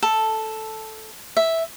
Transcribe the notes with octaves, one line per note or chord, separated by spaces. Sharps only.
A4
E5